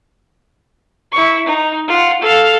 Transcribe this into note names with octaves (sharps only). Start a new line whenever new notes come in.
E4 C#6
D#4
F4 F#5
A4 F5